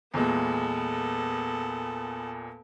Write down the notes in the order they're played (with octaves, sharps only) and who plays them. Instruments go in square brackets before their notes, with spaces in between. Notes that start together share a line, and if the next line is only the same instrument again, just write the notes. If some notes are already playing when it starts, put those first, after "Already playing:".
[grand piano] E2 A#2 G#3 [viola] B3 A4